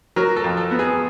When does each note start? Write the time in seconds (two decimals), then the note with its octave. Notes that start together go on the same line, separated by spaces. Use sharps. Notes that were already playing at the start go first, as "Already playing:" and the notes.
0.16 F#3 A#4
0.36 A4
0.44 F2
0.57 A4
0.71 B3
0.79 G#4